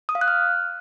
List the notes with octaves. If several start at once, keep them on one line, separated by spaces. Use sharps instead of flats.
D#6
F5
F#6
F6